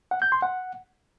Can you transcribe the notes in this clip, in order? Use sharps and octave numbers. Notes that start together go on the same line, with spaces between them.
F#5
G6
C6
F#5